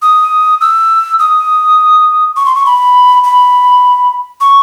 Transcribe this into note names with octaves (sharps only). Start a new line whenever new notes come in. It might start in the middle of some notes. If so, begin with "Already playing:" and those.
D#6
E6
D#6
C#6
C6
C#6
B5
B5
C#6